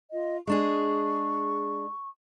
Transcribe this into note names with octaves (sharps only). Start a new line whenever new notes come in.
F4 D#5
G#3 D4 G#4 C#6